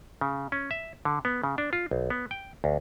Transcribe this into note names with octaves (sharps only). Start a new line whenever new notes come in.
C#3
C#4
E5
D3
B3
C#3
D4
F4
B1
B3
G5
D2